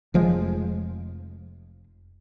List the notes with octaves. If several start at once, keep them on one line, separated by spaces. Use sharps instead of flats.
F1 F3 G#3